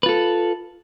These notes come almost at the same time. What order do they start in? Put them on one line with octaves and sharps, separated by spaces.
B4 F4 A4